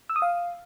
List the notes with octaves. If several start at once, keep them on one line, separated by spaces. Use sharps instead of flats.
E6
D#6
F5